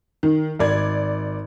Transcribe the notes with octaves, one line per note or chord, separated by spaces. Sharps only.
D#3
G#1 D5 G#6